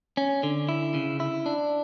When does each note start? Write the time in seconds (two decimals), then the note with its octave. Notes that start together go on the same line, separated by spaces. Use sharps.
0.17 C#4
0.43 D3
0.69 E4
0.94 C#3
1.20 E4
1.46 D4